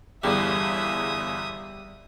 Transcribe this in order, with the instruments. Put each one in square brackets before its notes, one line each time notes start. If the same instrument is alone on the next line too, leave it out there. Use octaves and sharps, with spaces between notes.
[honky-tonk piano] G1 E2 G#4 [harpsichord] G3 [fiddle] E5 D#6